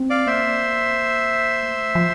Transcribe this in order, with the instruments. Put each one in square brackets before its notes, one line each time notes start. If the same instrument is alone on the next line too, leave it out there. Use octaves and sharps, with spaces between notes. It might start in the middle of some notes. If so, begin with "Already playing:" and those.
Already playing: [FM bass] C4
[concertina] D5 F5
[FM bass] A#3 [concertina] C5 E5
[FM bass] A3
F3